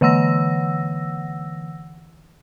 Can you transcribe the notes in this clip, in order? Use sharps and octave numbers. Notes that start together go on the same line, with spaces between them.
D3 E3 F#5 E6 A#6